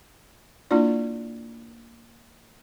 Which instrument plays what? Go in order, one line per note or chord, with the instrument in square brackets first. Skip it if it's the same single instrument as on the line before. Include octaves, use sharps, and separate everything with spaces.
[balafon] A#3 D4 E4 F4 D5